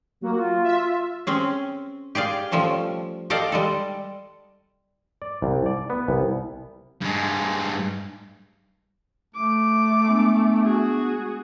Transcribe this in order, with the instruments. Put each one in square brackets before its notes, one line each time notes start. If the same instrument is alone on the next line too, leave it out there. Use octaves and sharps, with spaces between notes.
[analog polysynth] F#3 F#4 [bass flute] A#3
[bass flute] F4
[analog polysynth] E5
[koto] C4 C#4 G#4
G4 G#4 D5 F5
F3 G3 A3 C#4
G4 A4 D5 D#5 F5
G3 G#3 A4
[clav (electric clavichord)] D5
C2
D5
B3
C2
[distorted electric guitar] G2 G#3
[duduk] A3 [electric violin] D6
[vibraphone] G#3 B3 D4
[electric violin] F#4 G#4